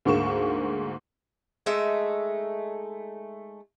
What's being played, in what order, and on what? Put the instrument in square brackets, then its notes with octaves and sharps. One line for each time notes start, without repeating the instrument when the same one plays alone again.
[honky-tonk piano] D2 G#2 A#3 C#6 E7
[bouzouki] G#3 A3 D#4 E5